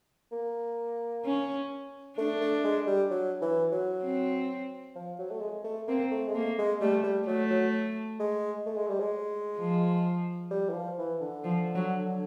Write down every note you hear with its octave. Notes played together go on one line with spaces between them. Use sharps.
A#3
C#4
A3 D4
A3
G#3
G3
F#3
E3
F#3
C4
F3
F#3
A3
G#3
A3
A#3 C4
A3
G#3
A3 A#3
G#3
G3 A3
G3
F#3 A3
F#3
G#3
A3
G#3
G3
G#3
F3
G3
E3
F3
E3
D3
F3
F#3